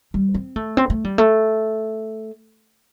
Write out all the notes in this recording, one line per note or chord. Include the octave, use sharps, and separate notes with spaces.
G3
C4
A3
C4
A3
G3
A3